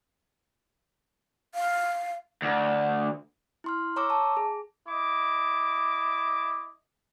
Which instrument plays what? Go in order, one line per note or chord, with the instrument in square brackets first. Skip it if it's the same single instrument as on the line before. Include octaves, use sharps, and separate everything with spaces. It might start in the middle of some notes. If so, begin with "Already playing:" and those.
[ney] F5
[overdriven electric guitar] D2
[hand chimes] E4 C6 F6
C#5 A#5 C#6 D6 E6
A5
G#4
[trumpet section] E4 D#5 D6